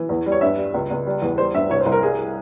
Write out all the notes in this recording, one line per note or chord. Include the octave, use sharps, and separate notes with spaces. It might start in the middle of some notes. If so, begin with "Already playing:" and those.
Already playing: E3
E2
G3
C#5
G2 E5
G3
C#2
C#2
G3
E2
G3 C5
G2 E5
C2 C#5
C5
C2
A#4
G3 G#4